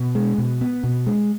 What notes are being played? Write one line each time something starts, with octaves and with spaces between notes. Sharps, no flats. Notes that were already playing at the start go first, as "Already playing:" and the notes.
Already playing: B2
G#3
B2
B3
B2
G#3